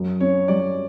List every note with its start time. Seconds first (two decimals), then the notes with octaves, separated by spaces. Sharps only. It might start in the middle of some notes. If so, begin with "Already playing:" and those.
Already playing: F#2
0.21 C#4 C#5
0.48 G3 D5